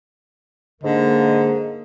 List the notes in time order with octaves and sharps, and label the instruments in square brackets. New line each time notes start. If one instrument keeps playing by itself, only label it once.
[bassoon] G#2 [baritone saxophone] D3 [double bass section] A#3 [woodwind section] D#5